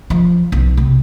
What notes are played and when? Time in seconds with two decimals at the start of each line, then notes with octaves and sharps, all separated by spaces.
0.10 F3
0.52 B1
0.77 C3